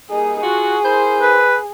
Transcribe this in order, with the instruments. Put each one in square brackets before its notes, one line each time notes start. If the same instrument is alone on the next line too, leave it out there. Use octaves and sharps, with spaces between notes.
[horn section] G3 A#3 D#4 [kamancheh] G#4
[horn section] F4 F#4 [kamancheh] G#4
[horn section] E4 A#4 C5
[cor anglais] B4